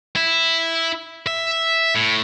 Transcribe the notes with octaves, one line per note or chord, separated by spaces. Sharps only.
E4
E5
A2